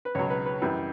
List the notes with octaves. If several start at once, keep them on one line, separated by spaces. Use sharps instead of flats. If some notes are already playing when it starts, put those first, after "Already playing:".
B4
C#2 B2 F#3 C#5
B4
B4
F#2 E3 G3